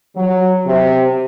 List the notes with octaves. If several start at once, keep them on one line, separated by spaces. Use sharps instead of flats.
F#3
C3